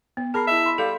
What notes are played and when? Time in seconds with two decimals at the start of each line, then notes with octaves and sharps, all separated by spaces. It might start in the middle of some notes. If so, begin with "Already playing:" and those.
0.17 B3
0.34 G#4 A#4 A5 B5 C7
0.47 E4 D#5 E5
0.66 B5 C6
0.78 G3 A4 F5